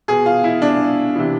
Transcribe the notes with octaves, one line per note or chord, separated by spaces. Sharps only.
B2 G#4
F4
E4
D4
C3 E3